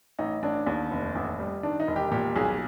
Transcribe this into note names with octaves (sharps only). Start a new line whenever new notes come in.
A1 D#4
A1 D4
D#2
F1
A1
G3
D#3 D4
D#4
E1
G4
A#2 G4
B1 G#4